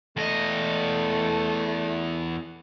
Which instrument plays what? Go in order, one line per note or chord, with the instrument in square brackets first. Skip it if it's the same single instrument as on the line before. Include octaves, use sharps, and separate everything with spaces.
[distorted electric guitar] E2 D#5 [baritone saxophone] A3